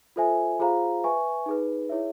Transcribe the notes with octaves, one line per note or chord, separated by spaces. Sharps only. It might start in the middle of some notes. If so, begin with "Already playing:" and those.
F4 A4 C5 E5 G#5
F4 G#4 C5 F5 A#5
B4 E5 G#5 C#6
D#4 G#4 B4
E4 G#4 C#5 E5